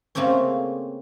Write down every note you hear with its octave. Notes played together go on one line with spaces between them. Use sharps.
C#3 A3 A#3 C4 C#4